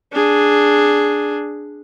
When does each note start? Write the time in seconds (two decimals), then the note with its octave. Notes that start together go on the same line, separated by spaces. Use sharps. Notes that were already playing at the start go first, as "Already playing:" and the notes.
0.13 D4 G#4